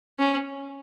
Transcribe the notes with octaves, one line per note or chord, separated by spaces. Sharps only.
C#4